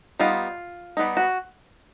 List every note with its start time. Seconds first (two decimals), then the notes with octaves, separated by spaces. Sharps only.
0.19 G3 B3 D#4 F4
0.97 G3 B3 D#4
1.17 F#4